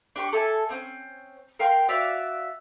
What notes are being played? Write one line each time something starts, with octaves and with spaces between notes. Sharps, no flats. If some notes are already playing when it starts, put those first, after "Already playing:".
D4 G4 C#6
A4 E5 G#5
A#3 C4 C#4
A#4 F5 G5 C6
F#4 D5 E5 F5